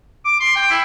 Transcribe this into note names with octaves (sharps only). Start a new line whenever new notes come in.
D6
C6
G5
E4